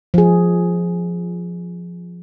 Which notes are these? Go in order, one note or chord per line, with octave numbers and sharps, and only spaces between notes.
F3 G#4